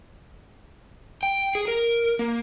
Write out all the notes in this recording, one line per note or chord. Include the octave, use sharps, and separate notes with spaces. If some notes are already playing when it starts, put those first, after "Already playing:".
G5
G#4
A#4
A#3